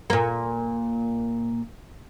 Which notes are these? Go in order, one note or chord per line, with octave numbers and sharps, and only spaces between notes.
A#2 A#3